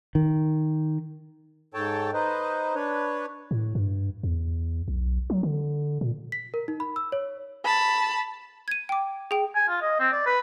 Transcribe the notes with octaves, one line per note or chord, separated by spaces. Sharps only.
D#3
G#2 A4 C#5 G5 A5
D#4 B4 C5 D#5
D4 B4 C#5
A2
G2
E2
B1
F#3
D3
A#2
B6
A#4
D#4
B5
E6
C#5
A5 B5
G#6 D#7
G5 D6
G#4 G5
G#5
F4
D#5
C4
D5
B4